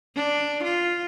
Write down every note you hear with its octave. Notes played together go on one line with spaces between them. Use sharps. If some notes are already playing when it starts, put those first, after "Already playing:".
D4
F4